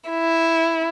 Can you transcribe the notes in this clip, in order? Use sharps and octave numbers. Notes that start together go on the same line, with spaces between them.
E4